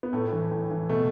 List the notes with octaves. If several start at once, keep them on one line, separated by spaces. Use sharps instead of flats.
B3
A2 A3
E3
A2
E3
B2 A3